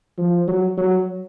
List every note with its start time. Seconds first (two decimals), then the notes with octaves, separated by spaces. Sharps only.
0.18 F3
0.48 F#3
0.77 F#3